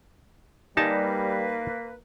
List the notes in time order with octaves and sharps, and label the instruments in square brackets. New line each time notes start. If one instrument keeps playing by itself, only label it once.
[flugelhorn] G3 [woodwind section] A#3 B4 [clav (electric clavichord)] D#4 A5 [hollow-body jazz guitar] G4 D5 G#5